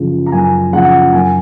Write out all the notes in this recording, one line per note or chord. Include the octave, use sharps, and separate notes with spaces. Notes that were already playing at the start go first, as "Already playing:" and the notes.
Already playing: F#2 C#3 F3
A#5
F#2 G#5
C#3 F3 F#5
F#2 G#5